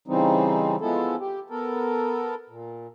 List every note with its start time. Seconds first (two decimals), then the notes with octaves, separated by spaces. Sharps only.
0.08 C#3 E3 G3 C4 D#4
0.81 F3 G#3 B3 E4 A4
1.20 G4
1.50 B3 A4 A#4
2.50 A#2